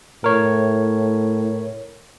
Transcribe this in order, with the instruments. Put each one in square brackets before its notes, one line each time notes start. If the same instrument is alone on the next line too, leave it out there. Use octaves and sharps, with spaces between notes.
[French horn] A2 [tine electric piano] A#4 C#5